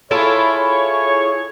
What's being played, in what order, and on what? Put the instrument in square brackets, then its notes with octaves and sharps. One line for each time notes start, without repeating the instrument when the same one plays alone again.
[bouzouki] E4 F4 A4 [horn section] G#4 C#5